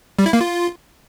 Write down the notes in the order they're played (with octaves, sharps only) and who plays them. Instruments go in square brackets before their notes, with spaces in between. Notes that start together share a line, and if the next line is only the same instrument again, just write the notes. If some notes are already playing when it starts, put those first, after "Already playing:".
[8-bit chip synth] G3
E4
A#3
F4